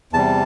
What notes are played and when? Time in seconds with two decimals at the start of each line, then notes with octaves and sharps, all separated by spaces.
0.13 E2 C3 G3 A5